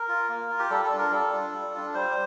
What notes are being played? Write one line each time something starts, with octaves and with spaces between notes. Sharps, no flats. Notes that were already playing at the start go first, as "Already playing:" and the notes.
Already playing: A#4
F4
A#3
F4
G4
G3 A4
A4
D4 F4
A#4
G3 A4
D4 F4
G3
D4 F4
G3 C5